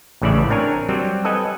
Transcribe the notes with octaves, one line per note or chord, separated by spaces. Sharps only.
A1 A2 C#3 E3 D5 E5
C4 D4 A#4 C#5 G#5
F#3 G3 C4
A4 B4 D#5 F#5 G#5